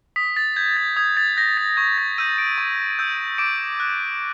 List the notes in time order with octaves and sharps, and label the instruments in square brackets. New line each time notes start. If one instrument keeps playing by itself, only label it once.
[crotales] D#6 B6
A6
G6 G#6
A6
D#6 G#6
A6
G6 A#6
A6
C#6 G#6
A6
E6 G6 D#7
D7
C#6
E6 G6
D6 D7
F#6